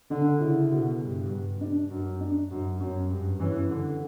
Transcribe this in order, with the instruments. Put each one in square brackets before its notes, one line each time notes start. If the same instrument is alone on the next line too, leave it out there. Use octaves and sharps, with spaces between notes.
[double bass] D3 [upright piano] D4
[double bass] C#3 [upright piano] E4
[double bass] B2
G2
[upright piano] D4
[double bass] F#2
[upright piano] D4
[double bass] F#2
[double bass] F#2 [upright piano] C#4
[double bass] G2
[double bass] E3 [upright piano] C#4
[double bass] D3